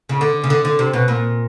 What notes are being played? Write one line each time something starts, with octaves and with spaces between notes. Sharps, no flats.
C#3
D3
C#3
D3
D3
C3
B2
A#2